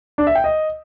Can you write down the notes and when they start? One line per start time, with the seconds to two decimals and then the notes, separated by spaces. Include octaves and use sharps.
0.18 D4
0.27 E5
0.35 G5
0.44 D#5